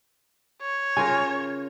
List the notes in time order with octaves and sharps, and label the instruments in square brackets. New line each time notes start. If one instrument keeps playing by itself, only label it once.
[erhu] C#5
[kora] C#3 F4 A#4 [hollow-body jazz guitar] G#5